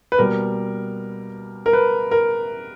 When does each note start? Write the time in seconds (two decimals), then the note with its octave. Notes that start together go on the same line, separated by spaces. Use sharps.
0.12 B4
0.18 B2 G3 A#3 A#4
1.66 A#4
1.73 B4
2.11 A#4